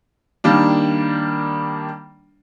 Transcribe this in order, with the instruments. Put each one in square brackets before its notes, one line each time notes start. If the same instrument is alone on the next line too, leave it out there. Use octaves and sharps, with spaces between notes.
[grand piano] D#3 G3 A#3 D4